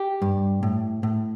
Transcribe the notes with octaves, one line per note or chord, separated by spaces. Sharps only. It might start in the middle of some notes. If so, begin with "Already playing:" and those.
Already playing: G4
G2
A2
A2